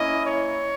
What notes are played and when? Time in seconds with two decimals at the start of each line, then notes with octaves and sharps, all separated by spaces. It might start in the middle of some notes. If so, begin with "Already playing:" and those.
Already playing: A#3 C#4 E4 D#5
0.26 C#5